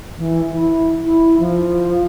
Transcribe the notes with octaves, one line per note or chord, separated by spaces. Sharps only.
E3
E4
E4
F3